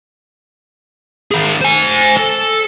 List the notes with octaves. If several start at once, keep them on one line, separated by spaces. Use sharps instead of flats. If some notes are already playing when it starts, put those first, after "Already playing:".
D#3 G#4
C5 G#5
A4